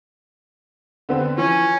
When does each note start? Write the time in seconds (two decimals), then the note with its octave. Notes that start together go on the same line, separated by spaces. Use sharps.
1.09 D3 B3 C4
1.38 E3 F3 C#4